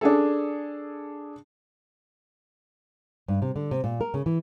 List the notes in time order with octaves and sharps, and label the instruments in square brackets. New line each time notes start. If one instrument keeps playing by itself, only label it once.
[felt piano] D4 G#4 A4
[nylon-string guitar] G2
C3
D3
C3
A#2
A#4
C#3
E3